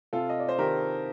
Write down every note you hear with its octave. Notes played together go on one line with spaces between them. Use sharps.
C3 F4 A4
D#5
D5
C5
D#3 G4 A#4